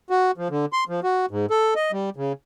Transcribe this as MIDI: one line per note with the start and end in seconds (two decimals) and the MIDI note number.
0.10 0.31 66
0.38 0.48 53
0.50 0.65 50
0.73 0.84 84
0.89 1.00 53
1.04 1.26 66
1.31 1.46 44
1.50 1.74 69
1.76 1.92 75
1.92 2.10 55
2.16 2.33 49